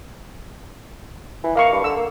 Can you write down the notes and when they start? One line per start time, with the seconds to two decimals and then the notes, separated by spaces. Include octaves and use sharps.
1.44 E3
1.55 A#3 D#5 F5 C#6
1.72 G2
1.84 D3 E6
1.97 A#3